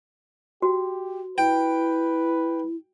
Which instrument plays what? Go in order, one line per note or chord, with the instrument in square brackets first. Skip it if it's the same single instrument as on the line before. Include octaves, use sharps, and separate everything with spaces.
[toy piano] F#4 [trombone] G4
[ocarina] E4 [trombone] B4 [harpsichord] G5